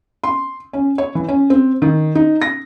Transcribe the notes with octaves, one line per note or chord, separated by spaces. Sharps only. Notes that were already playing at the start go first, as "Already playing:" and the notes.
C6
C#4
C#5
E3
C#4
C4
D#3
D#4
A#6